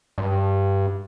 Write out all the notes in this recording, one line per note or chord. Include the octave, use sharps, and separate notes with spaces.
G2